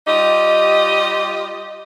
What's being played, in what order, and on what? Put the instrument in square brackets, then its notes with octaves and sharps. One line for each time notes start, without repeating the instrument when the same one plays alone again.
[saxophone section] G3 F4 G4 D#5